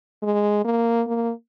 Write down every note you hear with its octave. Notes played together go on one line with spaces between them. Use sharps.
G#3
A#3
A#3